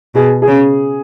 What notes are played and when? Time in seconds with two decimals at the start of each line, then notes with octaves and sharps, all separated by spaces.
0.15 B2 G#4
0.42 G#4
0.47 C#3